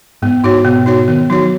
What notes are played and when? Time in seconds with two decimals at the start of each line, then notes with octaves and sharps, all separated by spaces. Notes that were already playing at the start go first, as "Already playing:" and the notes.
0.22 G#2 B3
0.44 G#2 D#4 F#4 C#5
0.65 B2 B3
0.86 D#4 F#4 C#5
1.08 D#3 B3
1.29 F#3 D#4 F#4 C#5